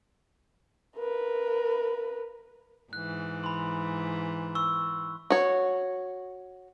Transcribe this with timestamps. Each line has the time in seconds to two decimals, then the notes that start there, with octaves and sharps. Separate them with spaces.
0.97 A#4 B4
2.93 G#2 E3 F#6
3.44 B5 C6
4.55 C#6 E6
5.30 F#4 C#5